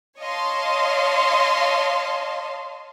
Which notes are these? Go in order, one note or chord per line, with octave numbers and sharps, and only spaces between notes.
C#5 D#5 F5 A5 C6